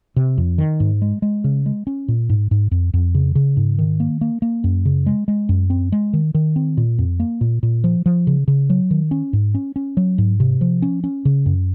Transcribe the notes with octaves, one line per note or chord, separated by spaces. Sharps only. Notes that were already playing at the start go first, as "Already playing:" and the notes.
C3
F2
D#3
G#2
G#3
G#3
C#3
G#3
C#4
A#2
G#2
G#2
F2
F2
C#3
C#3
G#2
D#3
A#3
A#3
A#3
F#2
C#3
G#3
G#3
F#2
C4
G#3
D#3
D#3
C4
A#2
F2
A#3
A#2
A#2
F3
F3
C#3
C#3
F#3
D#3
C#4
G#2
C#4
C#4
F#3
G#2
C3
F3
C#4
C#4
C#3
F#2